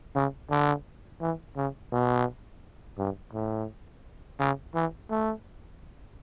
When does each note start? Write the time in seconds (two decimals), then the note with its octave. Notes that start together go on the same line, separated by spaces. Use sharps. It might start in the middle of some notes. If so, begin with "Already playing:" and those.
0.15 C#3
0.50 D3
1.21 E3
1.56 C#3
1.92 B2
2.98 G2
3.33 A2
4.40 C#3
4.74 E3
5.11 A3